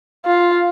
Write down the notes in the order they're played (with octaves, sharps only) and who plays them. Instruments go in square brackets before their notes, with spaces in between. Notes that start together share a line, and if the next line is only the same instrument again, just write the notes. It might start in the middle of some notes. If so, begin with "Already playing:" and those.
[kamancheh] F4